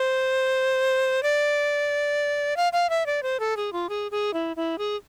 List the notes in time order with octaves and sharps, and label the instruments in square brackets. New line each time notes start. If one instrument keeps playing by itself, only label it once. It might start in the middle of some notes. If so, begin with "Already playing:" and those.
Already playing: [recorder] C5
D5
F5
F5
E5
D5
C5
A4
G#4
F4
G#4
G#4
E4
E4
G#4